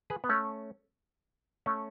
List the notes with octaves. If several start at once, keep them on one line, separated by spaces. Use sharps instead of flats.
G#4 B4
B3
A3 C#4
A3 C#4